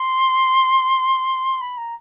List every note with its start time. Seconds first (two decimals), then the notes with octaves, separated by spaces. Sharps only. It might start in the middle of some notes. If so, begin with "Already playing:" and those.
Already playing: C6
1.61 B5
1.77 A#5